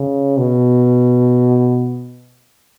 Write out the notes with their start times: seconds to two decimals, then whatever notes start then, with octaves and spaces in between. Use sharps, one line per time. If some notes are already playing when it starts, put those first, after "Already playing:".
Already playing: C#3
0.38 B2